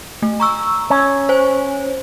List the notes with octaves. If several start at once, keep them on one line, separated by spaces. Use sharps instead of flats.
A3
A#5 C#6 E6
C#4
C5 G#5